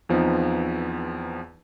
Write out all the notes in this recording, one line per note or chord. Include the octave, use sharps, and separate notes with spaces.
E2 F3 B3 C4 D#4